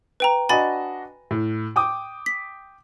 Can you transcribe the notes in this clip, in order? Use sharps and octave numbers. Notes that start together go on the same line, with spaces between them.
B4 G5 A#5
D4 F#4 D#5 G#5 B5 A6
A2
G5 D6 D#6
B6